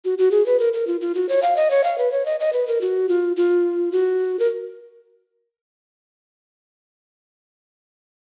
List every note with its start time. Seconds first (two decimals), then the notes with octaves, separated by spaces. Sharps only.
0.05 F#4
0.18 F#4
0.31 G#4
0.46 B4
0.60 A#4
0.73 A#4
0.87 F4
1.01 F4
1.15 F#4
1.29 C#5
1.42 F5
1.56 D#5
1.70 C#5
1.84 F5
1.98 B4
2.12 C#5
2.26 D#5
2.40 D#5
2.53 B4
2.67 A#4
2.81 F#4
3.09 F4
3.37 F4
3.92 F#4
4.39 A#4